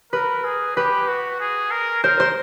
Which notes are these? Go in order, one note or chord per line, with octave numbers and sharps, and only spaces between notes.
A#4 B4
G#4
G4 B4
F#4
G#4
A#4
A#4 C5
C5